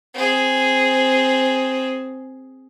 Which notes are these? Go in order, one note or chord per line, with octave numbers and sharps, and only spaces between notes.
C4 G#4